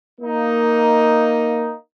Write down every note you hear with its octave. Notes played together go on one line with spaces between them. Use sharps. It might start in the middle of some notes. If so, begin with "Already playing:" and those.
A#3 D#4